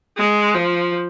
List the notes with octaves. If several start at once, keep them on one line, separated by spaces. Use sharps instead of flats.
G#3
F3